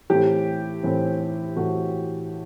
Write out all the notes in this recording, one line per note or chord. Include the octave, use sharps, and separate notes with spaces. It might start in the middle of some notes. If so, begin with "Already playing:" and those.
A2 E3 A3 C4 G4
A2 E3 A3 C4
A2 E3 A3 C4 F#4